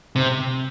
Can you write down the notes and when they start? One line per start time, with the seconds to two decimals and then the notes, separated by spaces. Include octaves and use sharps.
0.16 C3